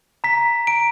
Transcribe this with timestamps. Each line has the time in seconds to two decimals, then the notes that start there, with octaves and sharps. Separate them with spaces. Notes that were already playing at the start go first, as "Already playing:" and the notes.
0.24 A#5 B6
0.67 A#5 D7